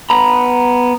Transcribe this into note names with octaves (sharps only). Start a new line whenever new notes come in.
B3 A#5 B5